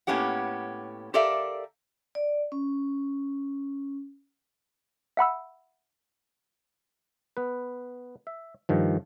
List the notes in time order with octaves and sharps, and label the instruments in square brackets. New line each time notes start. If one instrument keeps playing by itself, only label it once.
[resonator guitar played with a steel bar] A2 A#3 B3 C#4 G4 F#5
G4 A4 A#4 D5 E5 F5
[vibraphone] D5
C#4
[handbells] E5 F#5 B5 E6
[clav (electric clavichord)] B3 B4
E5
G2 D#3 F3